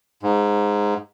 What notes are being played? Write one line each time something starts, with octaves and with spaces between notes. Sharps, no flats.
G#2